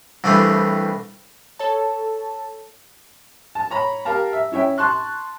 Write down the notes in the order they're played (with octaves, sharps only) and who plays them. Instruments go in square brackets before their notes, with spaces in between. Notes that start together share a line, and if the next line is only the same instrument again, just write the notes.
[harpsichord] C2 G2 E3 G3 A3 G#4
[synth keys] A4 C#5 A5
[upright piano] A5
C#5 A#5 B5
G4 A#4 F5 A5 A#5
E5
C#4 E4 C#5 E5 G5
A5 C6 C#6 F#6